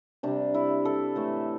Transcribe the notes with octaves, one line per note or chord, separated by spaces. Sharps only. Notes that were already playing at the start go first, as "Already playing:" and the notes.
C3 G3 D4
E4
A4
A2 E3 A3